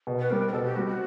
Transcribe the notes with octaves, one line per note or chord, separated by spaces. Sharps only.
B2
B4
G3 C4 A#4
A#4
B2 A4
G4
G3 C4 F#4
F#4